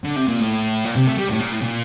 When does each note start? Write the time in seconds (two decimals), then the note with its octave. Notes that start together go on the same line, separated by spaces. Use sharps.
0.04 D3
0.16 C3
0.28 A#2
0.40 A2
0.85 A#2
0.95 C3
1.07 A3
1.18 G3
1.29 A2
1.40 A#2
1.51 A2
1.62 A#2